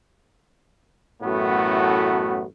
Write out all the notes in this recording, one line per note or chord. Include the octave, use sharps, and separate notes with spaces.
A1 F#2 A2 A3 B3 F#4